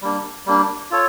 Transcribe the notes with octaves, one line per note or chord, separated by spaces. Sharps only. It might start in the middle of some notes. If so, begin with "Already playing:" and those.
G3 A#3 D4
G3 A#3 D4
F4 A4 C#5